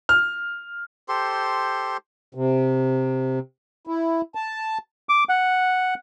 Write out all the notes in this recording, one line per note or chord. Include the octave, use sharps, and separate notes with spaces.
F6
G4 A4 C5 C6
C3
E4
A5
D6
F#5